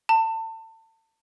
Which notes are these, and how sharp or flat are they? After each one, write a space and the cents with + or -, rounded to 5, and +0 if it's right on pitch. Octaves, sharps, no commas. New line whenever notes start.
A5 +30